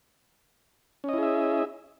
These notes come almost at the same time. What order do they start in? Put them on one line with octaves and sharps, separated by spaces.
C#4 D#5 E4 G#4 E5